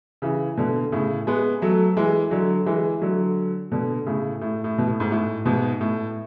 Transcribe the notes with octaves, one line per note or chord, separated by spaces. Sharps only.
C#3 E3
B2 D3
A2 C#3
G#3 B3
F#3 A3
E3 G#3
D3 F#3
E3 G#3
D3 F#3
B2 D3
A2 C#3
A2
A2
B2
A2
G#2
A2
G#2 B2
A2